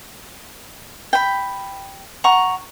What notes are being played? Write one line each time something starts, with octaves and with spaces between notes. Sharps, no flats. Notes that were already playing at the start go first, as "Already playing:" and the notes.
G5 B5
F#5 A#5 C#6